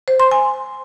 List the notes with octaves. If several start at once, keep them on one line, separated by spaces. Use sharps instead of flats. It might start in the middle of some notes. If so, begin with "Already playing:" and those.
C5
C6
G#5